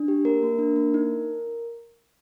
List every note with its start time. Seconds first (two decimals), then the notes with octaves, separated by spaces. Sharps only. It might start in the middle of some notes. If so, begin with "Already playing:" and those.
Already playing: D4
0.08 G4
0.25 A#3 A#4
0.43 A#3
0.59 D4
0.76 A#3
0.94 D#4